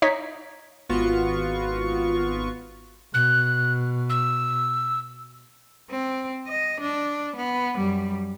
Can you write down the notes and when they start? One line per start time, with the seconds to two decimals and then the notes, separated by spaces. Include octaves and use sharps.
0.02 D#4 C#5 B6
0.89 G#1 B3 F4 F#4 C#6
3.14 B2 F#6
4.10 E6
5.90 C4
6.47 D#5
6.80 D4
7.36 B3
7.76 F#2 G3